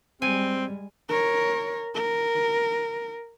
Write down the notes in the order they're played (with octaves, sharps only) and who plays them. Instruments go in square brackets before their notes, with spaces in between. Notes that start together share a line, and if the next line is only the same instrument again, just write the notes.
[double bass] G3 G#3 [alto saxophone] C4 [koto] G#5
[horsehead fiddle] A#4 C#5
A#4